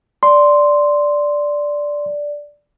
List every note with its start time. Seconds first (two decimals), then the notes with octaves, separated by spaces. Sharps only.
0.23 D5 C6